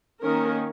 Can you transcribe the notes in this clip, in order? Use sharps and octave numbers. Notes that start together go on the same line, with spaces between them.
D#3 A#3 C#4 A#4